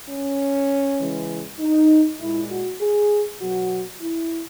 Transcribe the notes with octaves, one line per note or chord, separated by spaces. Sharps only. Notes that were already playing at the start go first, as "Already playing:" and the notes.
C#4
C#3 E3 G#3
D#4
A#2 G#3 E4
F#4
G#4
B2 F#3 F#4
E4